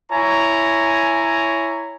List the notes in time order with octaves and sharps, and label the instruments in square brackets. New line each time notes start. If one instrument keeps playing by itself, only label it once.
[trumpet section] E4 C#5 G#5 A#5